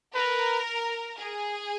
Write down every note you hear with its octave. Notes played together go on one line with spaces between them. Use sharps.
A#4 B4
G#4